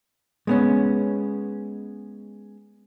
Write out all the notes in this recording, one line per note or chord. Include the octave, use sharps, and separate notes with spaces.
G#3 B3 C#4